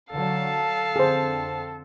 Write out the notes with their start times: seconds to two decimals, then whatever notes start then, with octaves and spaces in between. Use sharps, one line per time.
0.11 D3 F#3 A4 F5 A5
0.96 F2 D3 C4 G#4 C5